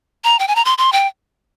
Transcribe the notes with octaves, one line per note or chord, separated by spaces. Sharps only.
A#5
G5
G#5
A#5
C6
C6
G5